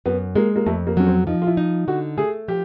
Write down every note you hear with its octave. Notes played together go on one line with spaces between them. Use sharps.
F#2 B3
G#3 A#3
A#3
F2 A3
A#3
F#3 C#4
C4
F3 D#4
F4
E4
D#4
D3 F#4
A3 G#4
F3 G4